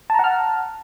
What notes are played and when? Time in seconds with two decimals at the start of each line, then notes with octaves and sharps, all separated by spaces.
0.10 A5
0.14 A#5
0.19 F#5
0.24 F6